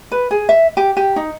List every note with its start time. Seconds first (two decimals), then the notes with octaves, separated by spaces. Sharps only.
0.12 B4
0.31 G#4
0.49 E5
0.77 G4
0.97 G4
1.16 D#4